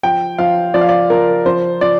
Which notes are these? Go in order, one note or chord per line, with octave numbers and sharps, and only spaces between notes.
F3 G5
F3 F5
F3 D5
F5
D5
F3 A#4
F3 C5
F3 D5